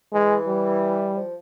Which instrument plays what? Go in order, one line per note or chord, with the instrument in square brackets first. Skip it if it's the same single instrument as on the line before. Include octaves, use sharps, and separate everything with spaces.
[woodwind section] E3 [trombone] G#3
[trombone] G3
[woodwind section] F3